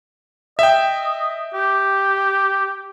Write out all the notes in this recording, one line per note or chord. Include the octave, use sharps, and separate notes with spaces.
D#5 E5 G5
G4